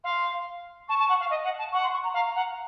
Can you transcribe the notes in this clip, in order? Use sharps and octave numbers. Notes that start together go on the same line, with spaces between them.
F5 C6
A5 C#6
A5
F#5
F5
D#5
F#5
A5
F#5 C#6
C6
C#6
A#5
F5 A#5
F#5